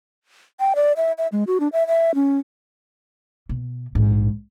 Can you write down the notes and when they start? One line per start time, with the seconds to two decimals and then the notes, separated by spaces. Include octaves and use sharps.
0.60 G5
0.76 D5
0.97 E5
1.18 E5
1.32 G#3
1.47 F#4
1.60 D4
1.73 E5
1.87 E5
2.15 C#4
3.49 B2
3.95 A#1 G#2